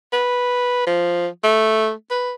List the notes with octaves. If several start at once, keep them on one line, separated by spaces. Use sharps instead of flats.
B4
F3
A3
B4